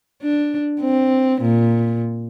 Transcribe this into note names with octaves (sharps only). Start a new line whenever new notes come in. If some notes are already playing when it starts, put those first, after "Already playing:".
D4
C4
A#2